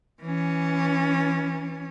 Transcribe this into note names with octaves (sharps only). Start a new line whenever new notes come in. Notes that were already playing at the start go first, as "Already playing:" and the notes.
E3 C#4